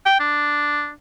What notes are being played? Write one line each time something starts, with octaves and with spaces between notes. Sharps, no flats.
G5
D4